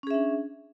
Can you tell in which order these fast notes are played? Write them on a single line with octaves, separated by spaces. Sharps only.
C#4 G#4 E5 D4